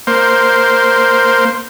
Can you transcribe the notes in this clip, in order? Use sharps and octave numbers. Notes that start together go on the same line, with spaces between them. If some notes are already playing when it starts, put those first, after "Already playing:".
A#3 C5